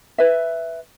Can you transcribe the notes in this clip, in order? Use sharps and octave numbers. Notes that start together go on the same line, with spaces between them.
B4 E5